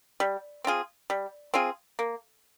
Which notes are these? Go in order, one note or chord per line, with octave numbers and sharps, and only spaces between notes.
G3
C4 F4 G#4
G3
C4 F4 G#4
A#3